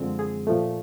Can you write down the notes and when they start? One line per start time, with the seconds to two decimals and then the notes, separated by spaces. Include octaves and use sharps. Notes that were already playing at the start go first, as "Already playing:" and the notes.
Already playing: F#2 D3 F3 G#3 C4
0.19 G#4
0.47 A#2 F3 A3